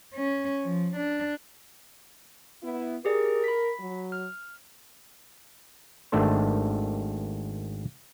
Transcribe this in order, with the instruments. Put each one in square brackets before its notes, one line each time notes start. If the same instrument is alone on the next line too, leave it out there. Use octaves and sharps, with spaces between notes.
[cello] C#4
F3
D4
[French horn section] B3 E4
[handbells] G4 G#4 D5 [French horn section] A#4
[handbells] B5 B6
[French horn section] F#3
[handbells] F6
[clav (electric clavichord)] G#1 D#3 A3 D4 A4 C5